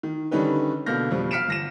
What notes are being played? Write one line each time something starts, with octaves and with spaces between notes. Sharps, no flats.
D#3
D3 D#3 G3 C#4 D#4 B4
B2 D3 A#3 F6 G6 A#6
F2 B2 F3 G3
F5 F6 B6 C#7 D7 E7
G1 A#6 E7